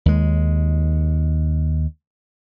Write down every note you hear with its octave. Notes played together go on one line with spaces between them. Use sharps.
D#2 G#3